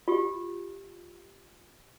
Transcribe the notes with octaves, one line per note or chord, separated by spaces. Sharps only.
F4 G4